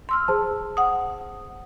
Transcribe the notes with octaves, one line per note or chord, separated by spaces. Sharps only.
C6 E6 F6
G#4 C5 A5
F#5 D#6